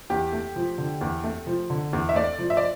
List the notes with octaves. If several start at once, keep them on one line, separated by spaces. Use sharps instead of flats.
E2 G4
A3
F3
D3
E2
A3
F3
D3
E2
E5
A3 D5
F3
E5
D5